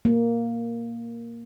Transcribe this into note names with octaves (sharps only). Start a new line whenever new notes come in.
A#3